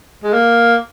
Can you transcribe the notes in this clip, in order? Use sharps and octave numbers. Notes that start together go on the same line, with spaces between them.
G#3
A#3